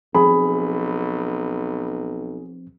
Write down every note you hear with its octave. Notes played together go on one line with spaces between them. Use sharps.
B1 F3 C4 G#4 B5